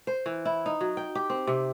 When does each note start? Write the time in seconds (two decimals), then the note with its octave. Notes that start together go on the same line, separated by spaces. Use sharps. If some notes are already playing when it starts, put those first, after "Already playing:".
0.07 C5
0.26 E3
0.45 E4
0.66 D#4
0.81 F#3
0.97 G5
1.15 G4
1.30 C4
1.47 C3